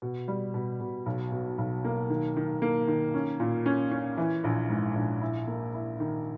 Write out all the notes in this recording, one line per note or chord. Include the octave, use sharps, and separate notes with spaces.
B2
G3
B2
B2
B1
B2
B1
A#3
D#3
D#3
A#3
D#3
C#4
A#2
C#4
C#4
E3
A#1
G#2
A#1
E4
A#3
E4
D#3